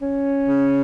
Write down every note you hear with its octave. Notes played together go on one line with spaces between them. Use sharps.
C#4
C#3